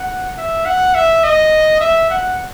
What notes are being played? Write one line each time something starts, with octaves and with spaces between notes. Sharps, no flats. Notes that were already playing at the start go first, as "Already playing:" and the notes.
Already playing: F#5
E5
F#5
E5
D#5
E5
F#5